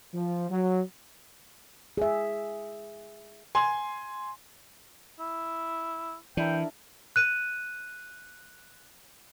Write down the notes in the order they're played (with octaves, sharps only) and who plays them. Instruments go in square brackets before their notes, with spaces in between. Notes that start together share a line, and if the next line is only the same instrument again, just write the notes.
[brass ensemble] F3
F#3
[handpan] G#4 E5
[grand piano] G#5 C6
[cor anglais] E4
[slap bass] E3 [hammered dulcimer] D4 E4 A#4 [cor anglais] G5
[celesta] F#6 D#7